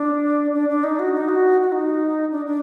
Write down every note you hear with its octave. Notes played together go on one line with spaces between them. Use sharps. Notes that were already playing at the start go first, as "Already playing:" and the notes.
Already playing: D4
D4
D4
D#4
F#4
D#4
F#4
F#4
D#4
D4
D4